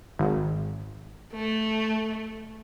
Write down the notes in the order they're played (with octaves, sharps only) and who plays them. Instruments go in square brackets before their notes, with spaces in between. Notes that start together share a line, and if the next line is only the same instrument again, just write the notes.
[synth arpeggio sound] G#1
[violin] A3